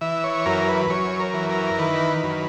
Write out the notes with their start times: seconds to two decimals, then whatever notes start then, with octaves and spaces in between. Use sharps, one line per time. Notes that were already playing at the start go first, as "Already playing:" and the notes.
0.01 E3 E5
0.24 C#5
0.46 F#2 A#4
0.68 B4
0.90 F#2 C#5
1.20 A#4
1.34 E3
1.50 A#4
1.78 D#3 B4
2.23 F#2